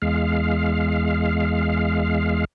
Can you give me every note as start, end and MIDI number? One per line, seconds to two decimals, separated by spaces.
0.02 2.45 40
0.02 2.45 56
0.02 2.45 77